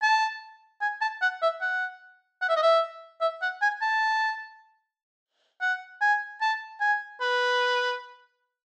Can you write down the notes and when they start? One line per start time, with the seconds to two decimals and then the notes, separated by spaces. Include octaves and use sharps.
0.02 A5
0.81 G#5
1.01 A5
1.22 F#5
1.42 E5
1.61 F#5
2.42 F#5
2.49 E5
2.56 D#5
2.62 E5
3.21 E5
3.42 F#5
3.62 G#5
3.81 A5
5.61 F#5
6.01 G#5
6.41 A5
6.81 G#5
7.21 B4